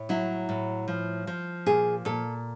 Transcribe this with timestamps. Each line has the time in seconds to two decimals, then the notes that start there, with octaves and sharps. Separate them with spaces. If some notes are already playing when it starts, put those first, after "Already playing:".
Already playing: A2
0.09 F#3 E4
0.49 A2
0.88 F3
1.27 F3
1.66 A#2 G#4
2.05 A#2 A4